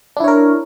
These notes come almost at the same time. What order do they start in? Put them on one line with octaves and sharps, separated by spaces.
D4 E4 C#5 A#4